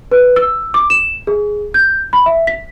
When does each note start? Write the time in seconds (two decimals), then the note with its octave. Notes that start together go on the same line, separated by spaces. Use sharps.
0.12 B4
0.36 E6
0.74 D6
0.90 E7
1.27 G#4
1.74 G6
2.13 B5
2.26 E5
2.47 B6